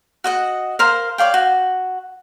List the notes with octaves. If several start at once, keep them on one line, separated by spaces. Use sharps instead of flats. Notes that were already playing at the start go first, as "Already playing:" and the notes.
F#4 D#5 F#5
A#4 C5 F5
C#5 D5 F5 G5
F#4